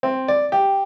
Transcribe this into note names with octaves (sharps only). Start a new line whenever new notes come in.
C4
D5
G4